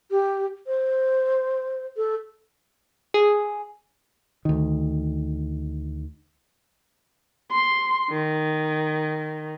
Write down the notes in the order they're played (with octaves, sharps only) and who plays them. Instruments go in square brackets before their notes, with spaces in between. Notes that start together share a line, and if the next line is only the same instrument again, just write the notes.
[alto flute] G4
C5
A4
[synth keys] G#4
[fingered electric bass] D2 D#3
[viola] C6
D#3